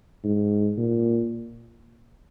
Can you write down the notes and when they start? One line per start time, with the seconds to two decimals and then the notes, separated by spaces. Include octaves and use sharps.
0.24 G#2
0.78 A#2